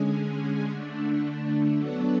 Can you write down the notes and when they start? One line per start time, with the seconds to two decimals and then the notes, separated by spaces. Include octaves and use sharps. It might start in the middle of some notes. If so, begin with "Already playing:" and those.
Already playing: D3 G#3 C#4 G#4
0.69 D3 A3 D4
1.76 F#3 B3 D4 F#4 A4